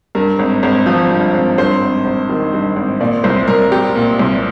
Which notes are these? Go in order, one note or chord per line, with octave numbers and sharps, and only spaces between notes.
G2 A#4
G#1
G#1
F3
G2
G#1
G2 C5
G#1
G#1
D#3
G2
G#1
A#2 D5
C2 C5
C2 A#4
G3 G4
A#2
C2